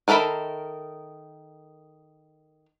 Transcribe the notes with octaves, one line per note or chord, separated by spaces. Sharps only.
D#3 A4 A#4 E5 B5